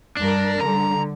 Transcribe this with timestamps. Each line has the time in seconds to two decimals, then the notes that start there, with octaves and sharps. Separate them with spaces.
0.17 G2 D4 A#4
0.61 D3 G3 A#5